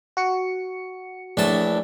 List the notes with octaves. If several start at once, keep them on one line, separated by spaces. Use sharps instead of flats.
F#4 C#7
A#1 A2 E3 D4 D5 A5